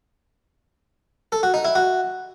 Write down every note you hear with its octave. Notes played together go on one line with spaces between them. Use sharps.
A4
F#4
D#4
E4
F#4